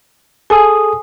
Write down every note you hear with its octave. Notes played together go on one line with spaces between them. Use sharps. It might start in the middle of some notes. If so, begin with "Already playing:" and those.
G#4 A4 G#5 D#6